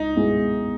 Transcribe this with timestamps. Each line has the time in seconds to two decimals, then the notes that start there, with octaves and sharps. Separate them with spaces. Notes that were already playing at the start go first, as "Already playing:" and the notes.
Already playing: C#2 D#4
0.15 B2 G#3 B3 E4